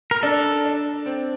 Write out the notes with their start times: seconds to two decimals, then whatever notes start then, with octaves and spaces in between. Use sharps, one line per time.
0.11 A#4
0.23 D4 A4
0.65 D4
1.06 C4